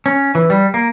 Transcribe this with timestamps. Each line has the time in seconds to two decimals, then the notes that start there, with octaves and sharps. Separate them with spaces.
0.06 C#4
0.35 E3
0.50 G3
0.74 A#3